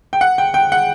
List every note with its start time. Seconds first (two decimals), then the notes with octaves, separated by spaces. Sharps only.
0.13 G5
0.21 F#5
0.38 G5
0.54 G5
0.72 F#5